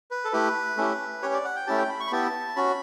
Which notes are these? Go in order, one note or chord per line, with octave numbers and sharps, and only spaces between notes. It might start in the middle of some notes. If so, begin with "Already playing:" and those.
B4
A4
A3 E4 G4 B4
A3 C#4 E4 G4
C#4 G4 C#5
D5
F#5
G5
A3 C#4 E4 G4 A5
G5
B5
C#6
B5
B3 E4 G4 A5
C#4 F#4 B5